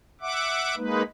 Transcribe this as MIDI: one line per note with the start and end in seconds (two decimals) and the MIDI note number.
0.21 0.75 76
0.21 0.75 78
0.21 0.75 86
0.77 1.02 56
0.77 1.02 58
0.77 1.02 63
0.77 1.02 71